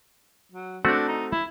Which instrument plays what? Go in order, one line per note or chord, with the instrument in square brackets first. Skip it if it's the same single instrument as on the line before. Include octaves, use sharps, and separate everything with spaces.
[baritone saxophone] F#3
[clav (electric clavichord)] A3 C4 F#4 [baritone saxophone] D4
[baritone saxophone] D#4
E4